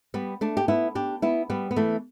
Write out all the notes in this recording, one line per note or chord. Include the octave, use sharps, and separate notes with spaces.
G3 B3
A3 D4
G4
B3 E4
D4 G4
B3 E4
G3 B3
B3
E3 A3